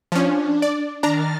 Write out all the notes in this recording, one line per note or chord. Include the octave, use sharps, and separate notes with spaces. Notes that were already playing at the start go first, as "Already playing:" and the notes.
F3 C#4 D4
D5
D#3 D4 A#5 F6 A6